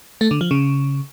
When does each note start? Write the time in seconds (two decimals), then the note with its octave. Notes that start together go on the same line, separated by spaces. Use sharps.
0.21 A3
0.31 D3
0.41 F3
0.51 C#3